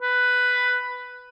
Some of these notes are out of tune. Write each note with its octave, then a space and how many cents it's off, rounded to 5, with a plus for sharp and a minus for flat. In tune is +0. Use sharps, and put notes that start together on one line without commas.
B4 +5